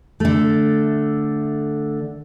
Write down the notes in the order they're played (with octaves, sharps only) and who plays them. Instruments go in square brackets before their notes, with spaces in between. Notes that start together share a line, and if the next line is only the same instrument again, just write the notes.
[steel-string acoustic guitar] D3 A3